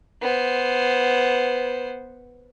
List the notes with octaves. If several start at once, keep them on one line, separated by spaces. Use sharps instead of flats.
B3 C5